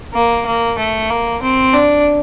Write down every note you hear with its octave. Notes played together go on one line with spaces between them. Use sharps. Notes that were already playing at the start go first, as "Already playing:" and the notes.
A#3
A#3
A3
A#3
C4
D4